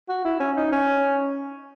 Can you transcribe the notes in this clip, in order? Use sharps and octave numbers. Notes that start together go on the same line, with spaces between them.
F#4
E4
C#4
D#4
C#4